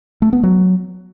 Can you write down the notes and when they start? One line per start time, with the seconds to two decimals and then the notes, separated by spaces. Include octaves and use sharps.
0.22 A3
0.33 B3
0.43 F#3